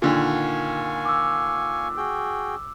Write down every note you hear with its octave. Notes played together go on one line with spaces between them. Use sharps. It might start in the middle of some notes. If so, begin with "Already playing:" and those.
A#2 D3 D#3 F5 G#5 C#6
D6 E6
F#4 G#4 G5